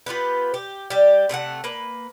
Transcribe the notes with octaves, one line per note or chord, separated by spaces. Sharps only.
B3 F4 G4 B4
G4
G3 G4
C3 A3 A4 F#5
A#3 B4